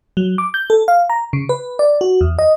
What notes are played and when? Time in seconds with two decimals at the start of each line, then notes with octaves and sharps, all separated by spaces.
0.17 F#3
0.38 D6
0.54 G6
0.70 A4
0.88 F5
1.10 A#5
1.33 C#3
1.49 B4
1.79 D5
2.01 F#4
2.21 E2
2.39 D#5